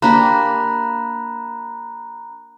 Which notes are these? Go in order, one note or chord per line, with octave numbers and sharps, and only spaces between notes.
A#3 D4 G4 A#5 B5 F#6